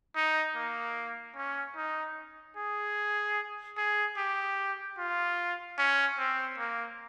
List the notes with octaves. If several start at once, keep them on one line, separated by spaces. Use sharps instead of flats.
D#4
A#3
C#4
D#4
G#4
G#4
G4
F4
C#4
C4
A#3